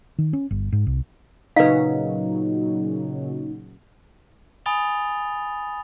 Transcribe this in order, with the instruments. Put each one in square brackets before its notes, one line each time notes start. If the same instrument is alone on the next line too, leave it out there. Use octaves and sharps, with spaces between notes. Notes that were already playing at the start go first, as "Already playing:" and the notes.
[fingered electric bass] D#3
C#4
G1
G#2
C2
[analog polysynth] A#2 C#3 F#3 [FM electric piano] D#4 [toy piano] B4 F5
[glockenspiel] G#5 B5 D#6 A6 F7 G7